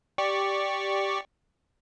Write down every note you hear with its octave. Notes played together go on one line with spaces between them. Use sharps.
G4 D5 C#6